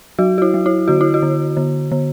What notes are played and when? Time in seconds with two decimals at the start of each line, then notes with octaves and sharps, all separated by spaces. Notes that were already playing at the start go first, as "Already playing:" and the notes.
0.19 F#3 F#4
0.38 F#4
0.42 E4
0.54 F#3
0.66 E4
0.88 D3 F#4
1.01 E4
1.14 F#4
1.23 D3
1.57 D3
1.92 D3